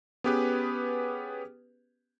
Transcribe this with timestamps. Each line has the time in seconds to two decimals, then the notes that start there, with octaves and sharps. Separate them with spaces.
0.24 B3 C#4 G4 G#4 B4